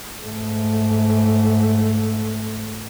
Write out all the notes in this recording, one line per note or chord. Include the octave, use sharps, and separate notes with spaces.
G#2 A3